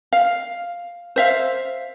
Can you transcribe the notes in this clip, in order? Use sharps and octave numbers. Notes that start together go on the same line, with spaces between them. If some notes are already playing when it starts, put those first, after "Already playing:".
F5
C5 E5 F5